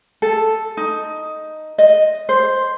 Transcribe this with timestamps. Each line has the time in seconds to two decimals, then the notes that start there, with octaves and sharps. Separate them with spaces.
0.22 A4
0.77 D#4
1.78 D#5
2.29 C5